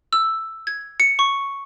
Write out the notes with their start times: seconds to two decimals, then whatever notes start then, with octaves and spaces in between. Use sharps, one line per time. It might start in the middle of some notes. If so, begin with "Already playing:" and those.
0.13 E6
0.67 G#6
1.00 C#7
1.19 C#6